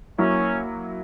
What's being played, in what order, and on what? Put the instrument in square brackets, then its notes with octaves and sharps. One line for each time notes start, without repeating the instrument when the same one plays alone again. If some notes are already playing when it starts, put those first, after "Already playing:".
[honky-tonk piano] F#3 A#3 E4 [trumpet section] C#4